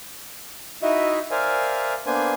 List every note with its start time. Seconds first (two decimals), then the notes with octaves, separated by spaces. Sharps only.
0.82 D#4 E4 F#4 D#5 E5
1.31 A#4 C5 D5 E5 F5 G#5
2.06 A#3 B3 D4 C5 G#5